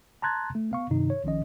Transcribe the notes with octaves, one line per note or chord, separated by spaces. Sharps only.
A5 A#5 C6 F#6 G#6 A6
A3
B3 F5 C#6
G2 C3 D#3 D#4
C#5
A#1 D#3 F3 C#4 D#5